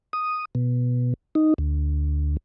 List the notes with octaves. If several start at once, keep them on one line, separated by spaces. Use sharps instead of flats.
D#6
B2
D#4
D2